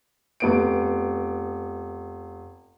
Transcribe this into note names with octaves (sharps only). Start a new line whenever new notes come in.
F1 B3 D7